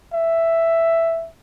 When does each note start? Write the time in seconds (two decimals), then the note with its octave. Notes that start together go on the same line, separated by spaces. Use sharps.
0.13 E5